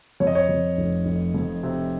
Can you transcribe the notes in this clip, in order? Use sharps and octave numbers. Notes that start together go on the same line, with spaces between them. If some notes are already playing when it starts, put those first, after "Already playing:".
F2 C#5
D#5
C#5
F2
F1
F1
F2
C3